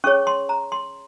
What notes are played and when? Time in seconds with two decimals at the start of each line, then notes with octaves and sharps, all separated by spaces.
0.04 C#4 G#4 C#5 C#6
0.27 C6
0.49 A#5
0.72 C6